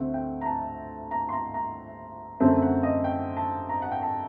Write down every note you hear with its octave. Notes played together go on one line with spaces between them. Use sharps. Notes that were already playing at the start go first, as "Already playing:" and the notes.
Already playing: D2 D3 A3 C4 F#5
G5
A#5
A5
A#5
C6
A#5
A#5
F#2 D3 A3 C4 A5
F#5
D#5
G5
A5
A#5
F#5
G5
A5